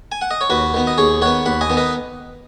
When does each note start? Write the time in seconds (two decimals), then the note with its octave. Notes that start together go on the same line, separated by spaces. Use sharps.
0.12 G#5
0.21 F#5
0.31 D#5
0.41 C#5
0.50 D#2 F#4 B4
0.74 D#3 B3
0.87 D#5
0.98 D#2 G#4 C#5
1.22 D#3 B3 C#5 F#5
1.46 D#2 F#5 B5
1.61 D#5 G#5
1.70 D#3 B3
1.77 B4 D#5